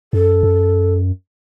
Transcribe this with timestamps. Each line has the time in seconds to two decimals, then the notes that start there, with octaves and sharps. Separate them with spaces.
0.13 F#2 A4
0.43 F#2